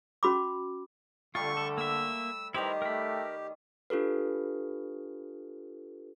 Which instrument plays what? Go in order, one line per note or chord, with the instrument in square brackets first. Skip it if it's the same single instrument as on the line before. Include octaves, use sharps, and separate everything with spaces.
[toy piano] C#4 F#4 B5 D6
[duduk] D3 [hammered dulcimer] G3 A3 [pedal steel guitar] F4 [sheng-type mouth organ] C#6
[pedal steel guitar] A4
[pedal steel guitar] A#3 E5 [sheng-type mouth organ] E6
[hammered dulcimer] D#3 G3 D#5 [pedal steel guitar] E4 B4 A#5 [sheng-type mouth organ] G4 [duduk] C5
[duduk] A3 [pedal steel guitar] A#4 B5
[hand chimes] D4 F4 G4 A4 B4